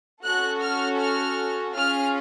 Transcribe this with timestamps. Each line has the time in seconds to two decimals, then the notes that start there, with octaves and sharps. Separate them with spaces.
0.24 C#4 F#4 A4 F#6
0.62 F6
1.00 F6
1.74 C#4 F4 G#4 F6